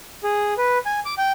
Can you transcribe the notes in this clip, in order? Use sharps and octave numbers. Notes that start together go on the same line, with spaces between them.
G#4
B4
G#5
D6
G5